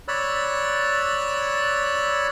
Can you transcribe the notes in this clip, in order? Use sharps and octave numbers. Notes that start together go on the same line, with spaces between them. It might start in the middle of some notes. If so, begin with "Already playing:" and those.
C#5 D5 B5 E6 F#6